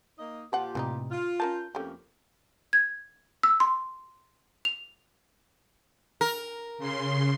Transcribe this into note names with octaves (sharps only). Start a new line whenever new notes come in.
A#3 D#4 D#5
A#2 F3 F4 G4 F#5
A2 C3 E3 G3 D#4
F4
C#4 A#4 A5 G6
F2 A3 A#3 C#4 G4
G#6
E6
C6
F7
A#4
C#3 C6